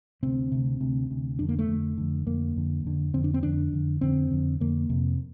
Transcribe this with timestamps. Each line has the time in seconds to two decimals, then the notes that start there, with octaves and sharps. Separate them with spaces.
0.23 D2 C3 C4
0.52 D2 C3
0.80 D2 C3
1.10 D2 C3
1.39 F2 D3 D4
1.49 A#3
1.59 A3
1.68 F2 D3
1.97 F2 D3
2.26 F2 D3 A#3
2.56 F2 D3
2.84 F2 D3
3.14 F2 D3 C4
3.24 D4
3.34 C4
3.43 F2 D3 D4
3.73 F2 D3
4.01 F2 D3 C4
4.30 F2 D3
4.60 F2 D3 A#3
4.90 F2 C3